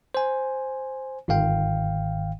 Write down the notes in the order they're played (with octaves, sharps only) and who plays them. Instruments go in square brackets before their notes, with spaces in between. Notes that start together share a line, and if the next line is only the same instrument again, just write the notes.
[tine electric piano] C5 G#5
G1 G#2 D#3 F5 G5